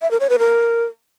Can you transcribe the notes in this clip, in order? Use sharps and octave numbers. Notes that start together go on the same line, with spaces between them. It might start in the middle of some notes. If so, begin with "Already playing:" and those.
E5
A#4
C#5
B4
A#4